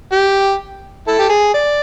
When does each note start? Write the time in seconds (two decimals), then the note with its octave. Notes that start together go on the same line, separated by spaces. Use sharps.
0.12 G4
1.07 E4 A4
1.19 G4
1.30 G#4
1.54 D5